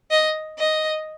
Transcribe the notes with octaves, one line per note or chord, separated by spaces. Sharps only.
D#5
D#5